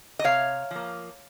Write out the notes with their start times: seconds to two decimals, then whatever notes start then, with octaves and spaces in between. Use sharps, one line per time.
0.19 D#5
0.24 C3 C#5 F5
0.71 F3 A#3